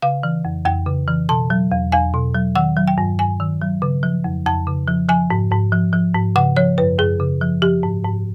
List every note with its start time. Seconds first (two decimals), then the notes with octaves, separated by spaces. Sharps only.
0.02 C#3 F5
0.23 E3
0.45 F2
0.65 F2 G5
0.86 C#3
1.08 E3
1.29 B2 A5
1.50 F#3
1.72 E2
1.92 E2 G#5
2.14 B2
2.35 F#3
2.55 D#3 F#5
2.77 F#3
2.88 G5
2.98 G2
3.19 G2 G#5
3.40 D#3
3.61 F#3
3.82 C#3
4.03 F3
4.24 F2
4.46 F2 A5
4.67 C#3
4.88 F3
5.09 F3 G#5
5.30 G#2
5.51 G#2
5.72 F3
5.93 F3
6.14 G#2
6.36 C#3 F#5
6.57 F3 C#5
6.78 F#2 B4
6.99 F#2 G#4
7.20 C#3
7.41 F3
7.62 F3 G4
7.83 G#2
8.04 G#2